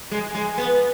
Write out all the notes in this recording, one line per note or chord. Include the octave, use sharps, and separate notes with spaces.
G#3
G#3
B3